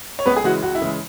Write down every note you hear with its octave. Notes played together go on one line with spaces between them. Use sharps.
C#5
C#2 B3 B4
G#4
C#3 E3 G#3 F#4
C#2 F#4
E4
C#3 E3 G#3